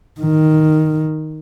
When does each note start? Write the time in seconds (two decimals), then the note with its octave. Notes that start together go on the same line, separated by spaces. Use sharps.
0.21 D#3